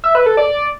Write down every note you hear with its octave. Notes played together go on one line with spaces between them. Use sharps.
E5
B4
A4
D5